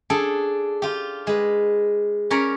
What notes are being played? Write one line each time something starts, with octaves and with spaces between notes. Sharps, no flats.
D4 G#4 A4
F4 G4
G#3 B4
C#4 A#4 C#5 D5 A#5 B5